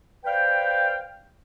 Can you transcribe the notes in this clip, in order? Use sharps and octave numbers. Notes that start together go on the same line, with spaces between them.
B4 C5 D5 F5 G5